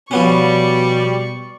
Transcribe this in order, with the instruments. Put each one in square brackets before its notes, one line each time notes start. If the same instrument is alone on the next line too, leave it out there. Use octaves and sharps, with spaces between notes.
[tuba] B2 [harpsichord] F3 B3 C#4 [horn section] G3 [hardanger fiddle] D5 C#6